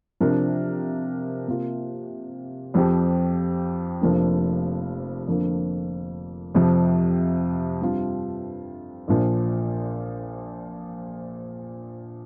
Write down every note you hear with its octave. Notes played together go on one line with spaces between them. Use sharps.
C3 F3 D4 A#4
C3 A#3 F4
F2 F3 C4 G4
F1 F2 F3 A#3 D4
F2 D3 A#3 F4
F2 C3 F3
G2 G3 C4 F4
A#1 A#2 F3